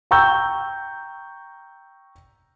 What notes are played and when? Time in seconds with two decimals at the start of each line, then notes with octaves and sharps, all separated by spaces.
0.11 G5 A#5 C#6 E6 G6